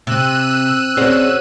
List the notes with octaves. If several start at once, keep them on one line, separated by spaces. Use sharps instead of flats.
C3 E6 F#6 D#7
C4 C#4 F#4 G#4 C5 D5